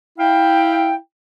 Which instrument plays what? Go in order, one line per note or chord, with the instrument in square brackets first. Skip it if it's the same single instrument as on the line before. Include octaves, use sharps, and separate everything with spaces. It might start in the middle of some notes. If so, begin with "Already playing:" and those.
[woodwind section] E4 F5 G5